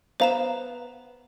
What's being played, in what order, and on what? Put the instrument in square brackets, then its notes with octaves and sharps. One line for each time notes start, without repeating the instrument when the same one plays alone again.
[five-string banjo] B3 F5 [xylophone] C5 A#5 E7